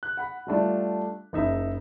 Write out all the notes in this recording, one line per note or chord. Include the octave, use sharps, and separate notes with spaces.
F#6
F#5 B5
G3 A3 D4 F4
F#1 D#4 E5